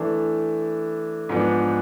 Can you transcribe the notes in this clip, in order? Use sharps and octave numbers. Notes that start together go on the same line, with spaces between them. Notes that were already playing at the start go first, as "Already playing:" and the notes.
Already playing: E3 A3 D4 A4
G#2 F3 B3 D4